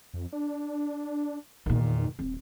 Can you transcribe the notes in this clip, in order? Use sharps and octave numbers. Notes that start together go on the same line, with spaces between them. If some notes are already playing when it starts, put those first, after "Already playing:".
F2
D4
E2 A#2 D#3
D#1 C4